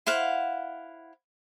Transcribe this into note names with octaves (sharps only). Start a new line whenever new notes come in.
E4 C5 F5 F#5